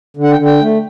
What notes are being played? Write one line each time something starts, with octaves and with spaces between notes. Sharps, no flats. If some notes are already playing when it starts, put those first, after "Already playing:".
D3
F#5
G5
D3
G5
A3